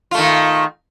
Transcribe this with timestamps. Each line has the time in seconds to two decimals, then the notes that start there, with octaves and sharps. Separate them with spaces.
0.11 F4
0.15 A3
0.18 D#3